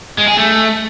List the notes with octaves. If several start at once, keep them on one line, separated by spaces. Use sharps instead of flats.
G#3
G#4
A3